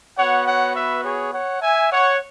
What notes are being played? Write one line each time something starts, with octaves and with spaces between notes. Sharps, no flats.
B3 F#4 C#5 F#5
C#5 F#5
B4 E5
G#4 C#5
C#5 F#5
E5 G#5
C#5 F#5